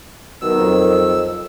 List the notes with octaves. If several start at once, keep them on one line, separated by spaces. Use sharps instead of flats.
B2 D#3 F#3 E6
F2